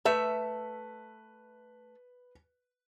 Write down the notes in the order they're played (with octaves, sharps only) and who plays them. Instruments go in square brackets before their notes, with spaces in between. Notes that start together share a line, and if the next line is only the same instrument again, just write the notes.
[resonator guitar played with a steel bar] A3 E5 [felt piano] B4